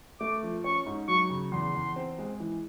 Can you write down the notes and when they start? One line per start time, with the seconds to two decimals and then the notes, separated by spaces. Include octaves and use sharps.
0.20 A3 D6
0.43 F3
0.64 C#4 C#6
0.86 G#2
1.08 F#3 C#6
1.30 C#3
1.52 E2 C6
1.75 E2
1.96 C4
2.18 G#3
2.40 E3